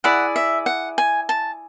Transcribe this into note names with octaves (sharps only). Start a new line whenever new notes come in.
E4 G#4 D5 F#5
E5
F#5
G#5
A5